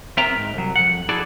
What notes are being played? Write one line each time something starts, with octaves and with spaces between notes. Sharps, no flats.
B3 C4 A#4 E5 G5 A#5
G#2
C2 F#3
F2 F#5
E4 F#4 G#4 A4 D5